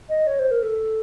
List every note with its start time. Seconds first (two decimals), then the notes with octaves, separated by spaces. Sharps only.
0.09 D#5
0.27 C#5
0.39 C5
0.51 A#4
0.62 A4